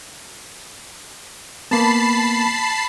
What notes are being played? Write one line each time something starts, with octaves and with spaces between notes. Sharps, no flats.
A#3 B3 A5 B5 C7